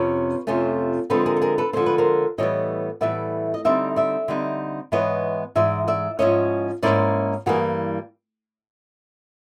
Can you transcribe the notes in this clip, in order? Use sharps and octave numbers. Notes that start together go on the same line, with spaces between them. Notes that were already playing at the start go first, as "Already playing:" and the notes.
Already playing: F2 C3 C#4 B4 C#5
F2 C3 F3 A3 C#4
D3 F3 G#3 C4 A4 B4
G#4 A#4
A4
G#4 A#4
A4 B4
D3 F3 G#3 C4 C5
B4
A#4 C5
A2 E3 G3 B3 C#5 D#5
A2 E3 G3 B3 D5 E5
D#5
D3 G3 C4 D#4 D5 E5
D5 E5
D3 G3 C4 D#4
G#2 E3 G#3 B3 E4 C#5 D#5
G#2 E3 G#3 D5 E5
D5 E5
G#2 F3 A#3 C#4 E4 C#5 D#5
G#2 F3 A#3 C#4 E4 C5 D5
G2 E3 G3 A#3 F#4 G#4